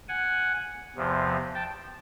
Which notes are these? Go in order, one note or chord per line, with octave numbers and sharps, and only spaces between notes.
F#5 G#5
E2 C3 F3
G5 A5